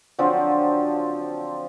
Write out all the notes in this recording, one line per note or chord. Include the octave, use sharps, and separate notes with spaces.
D3 F3 F#3 C4